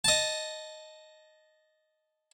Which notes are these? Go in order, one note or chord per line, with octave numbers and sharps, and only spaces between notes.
D#5 A5